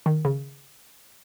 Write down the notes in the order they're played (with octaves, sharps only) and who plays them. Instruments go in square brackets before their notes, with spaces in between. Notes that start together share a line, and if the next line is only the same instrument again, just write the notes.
[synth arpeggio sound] D#3
C#3